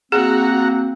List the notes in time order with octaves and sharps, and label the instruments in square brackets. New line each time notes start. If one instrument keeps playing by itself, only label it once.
[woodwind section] A#3 C4 [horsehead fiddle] F#4 [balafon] G#4 [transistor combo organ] F#5 A#5